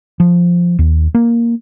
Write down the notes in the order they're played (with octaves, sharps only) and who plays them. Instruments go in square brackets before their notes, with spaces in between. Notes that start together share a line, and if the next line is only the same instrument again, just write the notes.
[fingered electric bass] F3
D#2
A#3